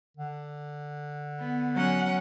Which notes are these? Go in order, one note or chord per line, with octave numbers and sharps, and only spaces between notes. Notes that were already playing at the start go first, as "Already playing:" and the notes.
D3
B3
F#3 C#4 F#5